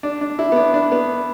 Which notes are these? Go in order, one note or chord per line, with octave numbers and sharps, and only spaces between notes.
D4
D4
E4
B3
D4
D4
B3